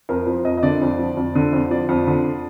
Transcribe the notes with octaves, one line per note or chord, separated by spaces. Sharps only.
F2 A#4
F3 C5
F2 D#5
D#5
D3 D5
F2
F3
F2
D3
F2
F3 D5
F2
D3